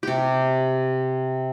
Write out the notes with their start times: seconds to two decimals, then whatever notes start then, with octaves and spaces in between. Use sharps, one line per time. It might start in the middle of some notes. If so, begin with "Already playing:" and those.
0.03 C3 G4